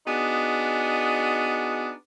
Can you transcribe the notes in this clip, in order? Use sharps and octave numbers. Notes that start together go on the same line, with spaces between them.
B3 D4 D#4 F#4 G#4